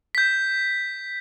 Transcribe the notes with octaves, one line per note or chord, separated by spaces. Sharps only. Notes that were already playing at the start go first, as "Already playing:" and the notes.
G6 B6